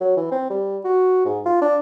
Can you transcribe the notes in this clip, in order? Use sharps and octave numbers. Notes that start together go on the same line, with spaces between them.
F#3
E3
C4
G3
F#4
G#2
F4
D4